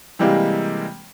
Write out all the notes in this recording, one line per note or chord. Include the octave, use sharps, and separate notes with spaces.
C3 E3 G3 G#3 A#3